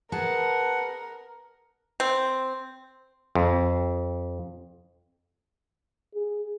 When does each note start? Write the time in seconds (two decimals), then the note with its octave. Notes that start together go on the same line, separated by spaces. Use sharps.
0.12 G#4 A#4 B4 F#5 A5
2.00 C4
3.35 F2
6.15 G#4